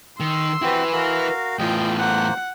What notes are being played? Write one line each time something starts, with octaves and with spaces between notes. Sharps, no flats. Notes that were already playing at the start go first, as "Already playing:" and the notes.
D#3 C6 E6
C4 E4 F#4 G4 B4
F#4 A#4 F5
E2 A2 F4 D#5 G5
A#3 C5 F#5